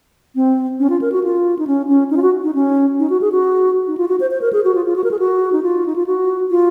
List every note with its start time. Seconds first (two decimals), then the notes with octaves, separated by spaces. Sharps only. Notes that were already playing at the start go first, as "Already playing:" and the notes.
0.35 C4
0.80 C#4
0.90 F4
1.02 A#4
1.12 F#4
1.24 F4
1.59 D#4
1.67 C#4
1.88 C#4
2.11 D#4
2.17 F4
2.22 F#4
2.43 D#4
2.55 C#4
2.99 D#4
3.10 F#4
3.21 G#4
3.32 F#4
3.87 D#4
3.97 F4
4.08 F#4
4.20 C5
4.31 C5
4.41 A#4
4.53 G#4
4.64 F#4
4.75 F4
4.86 F4
4.96 F#4
5.04 A#4
5.11 G#4
5.19 F#4
5.52 D#4
5.63 F4
5.86 D#4
5.96 F4
6.06 F#4
6.51 F4